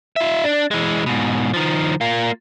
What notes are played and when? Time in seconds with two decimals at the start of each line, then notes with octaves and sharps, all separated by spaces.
0.16 F4 E5
0.44 D4
0.71 E3 G#3
1.06 G#2 B2
1.54 D#3 F3
2.01 A#3 F4